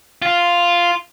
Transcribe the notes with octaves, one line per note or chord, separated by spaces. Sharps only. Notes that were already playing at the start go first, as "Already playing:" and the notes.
F4